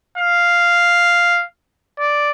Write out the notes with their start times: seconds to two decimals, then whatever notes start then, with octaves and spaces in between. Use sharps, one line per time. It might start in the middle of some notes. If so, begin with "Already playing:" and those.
0.18 F5
1.99 D5